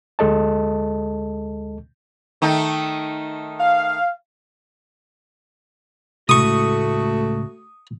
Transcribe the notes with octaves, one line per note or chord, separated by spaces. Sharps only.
D2 G#3 A4 D#5 A5
D#3 A3 D#4
F5
C#2 A2 A3 F#4 C#6 D#6